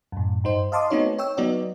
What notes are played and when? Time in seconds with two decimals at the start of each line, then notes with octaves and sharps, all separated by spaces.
0.12 F#2 A2
0.44 G2 D#4 C5
0.72 D#5 F5 A5 C6 D6 D#6
0.90 A3 B3 C4 D#4 F#4 C#5
1.18 C#5 G5 E6
1.37 F#3 B3 D#4 F#4 D5 D#5